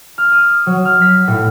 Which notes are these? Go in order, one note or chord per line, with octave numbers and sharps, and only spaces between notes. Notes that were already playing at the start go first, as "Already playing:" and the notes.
F6
D#6
F#3
F6
B6
A2